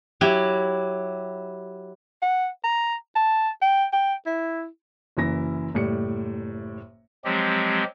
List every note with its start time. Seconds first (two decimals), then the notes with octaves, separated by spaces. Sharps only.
0.21 F#3 E4 G4
2.22 F#5
2.64 A#5
3.16 A5
3.62 G5
3.93 G5
4.26 E4
5.17 F#1 F#2 E3 E4 A#6
5.74 F#1 A2 G3 C#7
7.25 F3 F#3 G#3 C4 G4